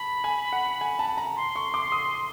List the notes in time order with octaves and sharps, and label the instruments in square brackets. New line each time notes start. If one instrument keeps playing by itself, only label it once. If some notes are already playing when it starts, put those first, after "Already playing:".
Already playing: [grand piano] A5 [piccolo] B5
[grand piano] G#5
F#5
G#5
A5
A#5
[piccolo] C6
[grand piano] C#6
D6
D#6